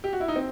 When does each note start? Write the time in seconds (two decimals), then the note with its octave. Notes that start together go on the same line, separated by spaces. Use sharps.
0.04 G4
0.13 F#4
0.20 E4
0.28 D#4
0.36 C4